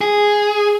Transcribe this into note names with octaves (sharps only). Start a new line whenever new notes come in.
G#4